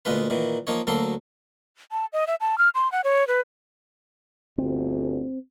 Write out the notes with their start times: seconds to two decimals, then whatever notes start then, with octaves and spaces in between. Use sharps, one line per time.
0.05 D2 A#2 G#3 F4 B4
0.30 A#2 D#3 E3
0.67 F3 A#3 D#4 C#5
0.87 D2 F#3 A#3 A4 C6
1.92 A5
2.13 D#5
2.27 E5
2.41 A5
2.58 F6
2.75 C6
2.92 F#5
3.04 C#5
3.28 B4
4.58 G1 D2 C4